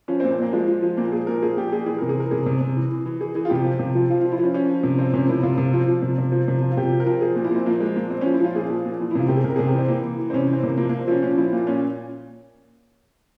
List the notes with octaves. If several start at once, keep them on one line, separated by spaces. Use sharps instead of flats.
F3 C#4
C4
A#2
C4
A#2 A#3
F3 G#3
F3
F3
A#2 A#3
F3 G#4
A#2 A#4
F3 G#4
A#2 G4
A#2 G#4
E3 G#4
C3 A#4
G#4
E3 A#4
C3 G#4
C3
C3
E3
E3
E3
E3 G#4
E3 G#4
F4
C3 G4
F3
C3
F3
F3 F4
F3 F4
E4
F3 C#4
F3 C#4
F3
C3
F3 C4
C3 C#4
C3 E4
C3 F4
C3
F3
F3
C3
C3
F3
C3
F3
F4
C3 G4
F3
A#4
F3
F3 G#4
A#2
E4
A#2 C4
F3 A#3
F3 G#3
A#2 A#3
A#2 C4
F3 C#4
E4
F3 F4
A#2 G#4
F3
A#2
E3
E4
C3 F4
C3 G4
G#4
C3 A#4
C3 G#4
G4
E3 C4
E3 A#3
E3
E3
C4
C3 C#4
E3 C4
C3 A#3
F3 A#3
F3 A#3
C4
F3 C#4
A#2 C#4
F3 E4
A#2 F4
A#2 C#4